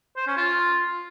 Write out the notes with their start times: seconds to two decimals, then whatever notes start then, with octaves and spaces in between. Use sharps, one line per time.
0.17 C5
0.27 C#4
0.37 F4